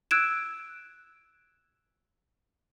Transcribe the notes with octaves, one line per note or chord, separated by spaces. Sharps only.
E6 F#6 G#6 D7 E7